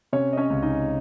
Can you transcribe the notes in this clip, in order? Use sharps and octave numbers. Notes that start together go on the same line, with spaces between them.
C3 C#4 C#5
D#5
C#4 C#5
C#2
D#4 D#5